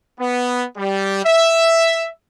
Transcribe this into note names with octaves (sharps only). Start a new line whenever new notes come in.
B3
G3
E5